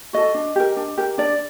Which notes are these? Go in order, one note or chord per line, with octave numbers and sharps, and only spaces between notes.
F#4 A4 D#5
D4
G4 A#4
D4
G4 A#4
D4 D5